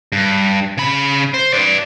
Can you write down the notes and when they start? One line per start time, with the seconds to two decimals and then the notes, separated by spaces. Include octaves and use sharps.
0.12 G2
0.78 C#3 B5
1.34 C5
1.53 B4 D5